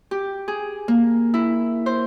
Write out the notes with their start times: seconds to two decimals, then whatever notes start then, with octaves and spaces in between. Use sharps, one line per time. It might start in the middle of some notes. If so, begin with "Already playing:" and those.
0.11 G4
0.48 G#4
0.88 A#3
1.34 E4
1.86 C5